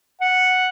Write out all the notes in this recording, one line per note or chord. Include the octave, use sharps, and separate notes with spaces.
F#5